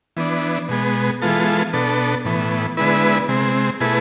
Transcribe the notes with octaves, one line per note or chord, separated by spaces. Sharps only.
E3 B3 D4
B2 G#3 B3
E3 G#3 B3 F4 A4
B2 B3 D4 A4
A2 E3 B3
D3 G#3 B3 E4 B4
C3 G#3 C4
B2 A3 E4 G#4 B4